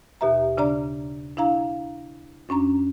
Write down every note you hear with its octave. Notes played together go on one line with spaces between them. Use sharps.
D#2 B2 G4 E5 A#5
C#3 D4 D5 A#5
D4 E4 F5 A#5
F#2 C#4 D4 A#5